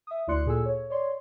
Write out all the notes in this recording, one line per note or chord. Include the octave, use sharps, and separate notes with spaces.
E5 D#6
D2 E4 D5 C6 F#6 C#7
A#2 G#4 A4 G#5 E6
C#5
C#5 D5 C6